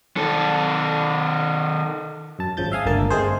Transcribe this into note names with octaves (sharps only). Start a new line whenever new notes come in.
D#3 A4
F#2 A5
G#1 C#3 F3 G6 A6
E5 F5 G#5 D#6
G1 C#2 D3 A#3 A#4 A5
G1 G#3 A3 C4 G#4 C5